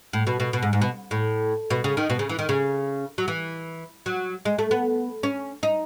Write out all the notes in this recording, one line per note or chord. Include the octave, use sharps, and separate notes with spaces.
A2
B2
B2
B2
G#2
G#2
B2
A2
B2
C#3
D#3
B2
C#3
E3
D#3
C#3
F#3
E3
F#3
G#3
A3
B3
C#4
D#4